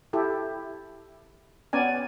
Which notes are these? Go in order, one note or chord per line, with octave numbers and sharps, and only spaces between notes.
E4 G4 A4
B3 C#4 D5 G#5